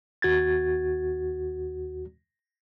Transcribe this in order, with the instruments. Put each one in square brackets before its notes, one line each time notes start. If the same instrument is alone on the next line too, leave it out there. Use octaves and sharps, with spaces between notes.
[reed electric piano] D#2 F#4 G#6 A6